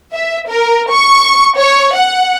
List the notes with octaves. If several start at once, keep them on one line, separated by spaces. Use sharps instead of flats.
E5
A#4
C#6
C#5
F#5